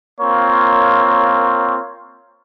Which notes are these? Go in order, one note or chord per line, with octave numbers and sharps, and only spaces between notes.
A#3 C4 F4 C#5